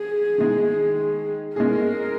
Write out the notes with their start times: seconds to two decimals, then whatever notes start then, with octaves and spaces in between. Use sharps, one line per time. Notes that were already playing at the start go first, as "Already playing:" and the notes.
Already playing: G#4
0.38 D#3 G#3 D#4
1.56 G#3 C#4 G#4 A#4